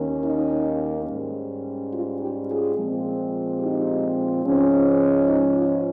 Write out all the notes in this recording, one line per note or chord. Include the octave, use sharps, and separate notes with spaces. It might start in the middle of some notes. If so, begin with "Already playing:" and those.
Already playing: D#2 D#3 A#3 C#4
D#4
G#2 G3 C#4
F4
D#4 G4
F4 G#4
A#2 F3 G#3 C4
D#4 G4
G#2 F3 G#3 C#4
D#4
F4